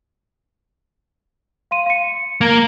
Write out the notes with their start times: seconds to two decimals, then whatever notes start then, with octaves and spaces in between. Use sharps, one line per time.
1.71 F5 C6 D#7
1.86 F5 C#7
2.41 A#3 A#5 G#6